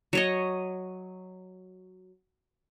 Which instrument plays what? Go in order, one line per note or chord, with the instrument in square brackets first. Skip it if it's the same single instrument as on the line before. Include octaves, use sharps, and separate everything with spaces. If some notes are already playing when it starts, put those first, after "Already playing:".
[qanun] F#3 C#5 D#5